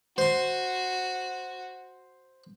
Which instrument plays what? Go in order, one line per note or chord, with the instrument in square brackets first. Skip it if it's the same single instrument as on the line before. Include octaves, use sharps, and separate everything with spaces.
[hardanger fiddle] F#4 [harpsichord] C5 C6